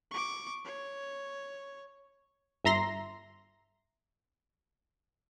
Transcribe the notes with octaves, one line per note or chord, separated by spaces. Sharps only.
C#6 D6
C#5
G1 E5 A#5 C6 A#6